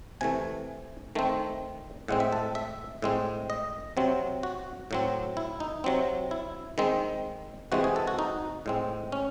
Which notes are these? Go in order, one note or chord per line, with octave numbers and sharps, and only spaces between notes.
C3 E3 A3 G#5
D#3 A3 C4
A2 G#3 C4 F#5
E5
A4
E5
A2 G#3 C4
D#5
C3 F#3 C4
F#4
A2 F#3 C4
E4
D#4
C3 F#3 C4
E4
D#3 G#3 C4
C3 E3 G#3 C4 F#4
G#4
A4
F#4
D#4
A2 G#3 C4
C#4